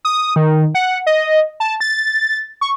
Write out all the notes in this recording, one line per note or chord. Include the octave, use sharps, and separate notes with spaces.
D#6
D#3
F#5
D#5
A5
A6
C#6